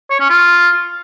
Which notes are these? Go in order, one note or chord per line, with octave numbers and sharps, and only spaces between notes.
C#5
C#4
F4